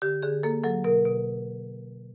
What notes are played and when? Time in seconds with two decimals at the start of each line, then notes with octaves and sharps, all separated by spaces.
0.02 D3 G4
0.22 D3 G#4
0.43 A#3 A4
0.63 F#3 A4
0.84 B2 A#4
1.05 B2